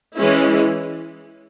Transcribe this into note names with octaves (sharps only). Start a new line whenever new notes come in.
E3 G#3 C#4 E4